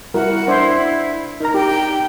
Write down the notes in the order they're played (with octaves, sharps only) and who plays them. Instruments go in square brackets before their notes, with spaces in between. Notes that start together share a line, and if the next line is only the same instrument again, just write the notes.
[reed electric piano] G3 [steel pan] E4 F#4 A#4 [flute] F#5
[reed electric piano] D4 [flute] E4 [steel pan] C5 C6
[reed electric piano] D#4 A#5 [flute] A#4
[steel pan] G4 [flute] G5